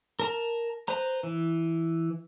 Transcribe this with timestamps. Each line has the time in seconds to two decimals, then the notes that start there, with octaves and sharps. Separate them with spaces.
0.20 A#4 A5 A#5
0.88 B4 C5 A#5
1.23 E3